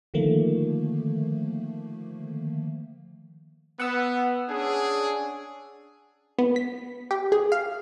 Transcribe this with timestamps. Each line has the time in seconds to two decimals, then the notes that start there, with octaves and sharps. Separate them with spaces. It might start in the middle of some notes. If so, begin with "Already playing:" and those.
0.14 D3 D#3 F3 A3 A#3
3.80 B3 F#5 E6
4.49 C#4 D4 G#4
6.39 B3
6.56 B6
7.11 G4
7.32 G#4
7.52 F5